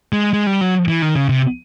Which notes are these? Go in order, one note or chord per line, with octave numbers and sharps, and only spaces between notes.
G#3
G#3
G3
F#3
E3
D#3
C#3
C3